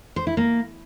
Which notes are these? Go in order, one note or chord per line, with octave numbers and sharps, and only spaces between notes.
C5
E4
A#3